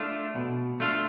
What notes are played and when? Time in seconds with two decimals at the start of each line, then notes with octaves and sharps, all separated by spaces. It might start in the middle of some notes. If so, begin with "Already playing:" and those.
Already playing: A3 D4 F4
0.35 B2
0.80 A3 D4 F4